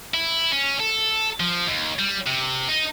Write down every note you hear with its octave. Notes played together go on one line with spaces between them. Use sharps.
E4
C#4
A4
F3
D#2
G3
C3
D#4